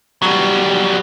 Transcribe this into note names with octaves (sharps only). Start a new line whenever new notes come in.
F#3 G3